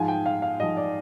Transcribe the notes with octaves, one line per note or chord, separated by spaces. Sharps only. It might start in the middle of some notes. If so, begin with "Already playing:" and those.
Already playing: G#2 F3 G#5
G5
F5
F5
G#2 F3 D#5
D5